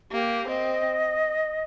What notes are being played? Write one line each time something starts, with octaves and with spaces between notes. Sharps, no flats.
A#3 G4
C4 D#5